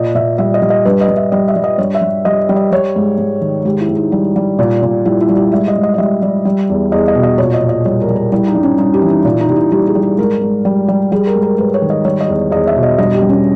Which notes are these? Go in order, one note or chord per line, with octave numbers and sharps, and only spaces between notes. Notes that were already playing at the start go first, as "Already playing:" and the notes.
Already playing: A#2 D#5
A#2 E5
G3 E5
D#5
G3
D#5
G2 B4
D#5
G2
E5
G3 D#5
E5
G3
D#5
G2 C#5
E5
G2
G3 D#5
G3
D#5
G3 C#5
G#2
G#2
D#3
G#2 G4
E4
G#2
D#4
G3
G3
A#2
A#2
G3 E4
E4
G3
G4
G#2 E5
D#5
G#2
D#5
D#5
G3 E5
G3
G3
E2
E2 D#5
D#5
B2
D#5
A#2 C#5
D#5
A#2
D#5
G3 C#5
A#4
G3
A#4
G3 E4
D#4
G2
C#4
G2 D#4
G4
E3
D#4
A#2
D#4
A#2 G4
E4
G3 G4
G#4
G3
G#4
G#2 A#4
G#2
G3
G3
G3 G#4
A#4
G#2
A#4
G#2 B4
C#5
D#3
D#5
G3 C#5
D#5
E2
E2 D#5
E5
B2
D#5
G2 D#5
G4
G2
C#4